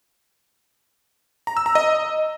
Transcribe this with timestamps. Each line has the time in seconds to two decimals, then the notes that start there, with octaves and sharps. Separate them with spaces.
1.47 A#5
1.57 E6
1.66 A#5
1.75 D#5